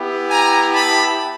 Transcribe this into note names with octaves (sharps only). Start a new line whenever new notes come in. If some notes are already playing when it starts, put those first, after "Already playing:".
Already playing: B3 E4 G4
G#5 A#5
A5 B5